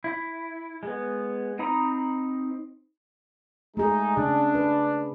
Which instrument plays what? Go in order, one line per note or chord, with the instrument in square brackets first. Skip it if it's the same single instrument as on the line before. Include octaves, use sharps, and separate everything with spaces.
[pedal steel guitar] E4
G#3 B3
C4 D#4 A#5 B5 D#6
[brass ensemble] G#3 D#4 [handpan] A3 G#4
[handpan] C#3 [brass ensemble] D4
[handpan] B4